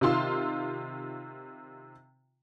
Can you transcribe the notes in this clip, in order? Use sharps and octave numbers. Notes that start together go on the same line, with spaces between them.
C3 D#3 F4 C6 E6